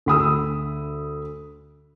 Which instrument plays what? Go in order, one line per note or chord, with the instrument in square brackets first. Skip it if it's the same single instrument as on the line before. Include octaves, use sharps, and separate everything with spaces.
[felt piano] D2 B5 D#6 E6